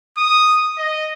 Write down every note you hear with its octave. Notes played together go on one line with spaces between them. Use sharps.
D#6
D#5